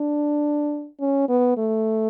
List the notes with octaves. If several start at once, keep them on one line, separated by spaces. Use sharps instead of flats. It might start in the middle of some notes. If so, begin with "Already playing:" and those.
Already playing: D4
C#4
B3
A3